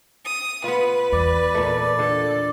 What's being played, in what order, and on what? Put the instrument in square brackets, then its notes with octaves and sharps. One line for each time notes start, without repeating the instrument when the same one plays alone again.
[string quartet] D#6
[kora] B3 F4 [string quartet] B4
[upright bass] E2 [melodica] D5
[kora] A#2 A3
[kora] D3 [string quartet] A4